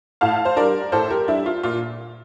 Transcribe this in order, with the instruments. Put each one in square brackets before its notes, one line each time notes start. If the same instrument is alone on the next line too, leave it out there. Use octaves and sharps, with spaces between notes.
[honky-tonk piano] A2 F5 A5
C5
G3 D4 A#4 D5
A2 A4 C5
G4 A#4
G3 D4 E4
F4
A#2 F4